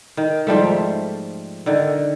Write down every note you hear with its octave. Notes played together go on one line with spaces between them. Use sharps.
D#3
G#2 F3 G3 A3
D3 D#3